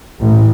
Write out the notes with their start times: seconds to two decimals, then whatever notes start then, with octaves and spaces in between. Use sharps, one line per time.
0.20 A1